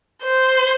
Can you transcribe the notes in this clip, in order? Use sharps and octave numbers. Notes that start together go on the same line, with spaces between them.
C5